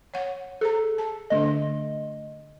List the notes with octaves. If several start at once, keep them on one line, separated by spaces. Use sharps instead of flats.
C#5 F#5
G#4 A4 C5 A#5
A5
D3 A3 D4 A4 D#5